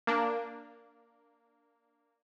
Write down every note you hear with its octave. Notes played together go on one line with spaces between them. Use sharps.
A#3 D4